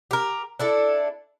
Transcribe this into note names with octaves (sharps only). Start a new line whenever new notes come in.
G4 A#4
D4 E4 A4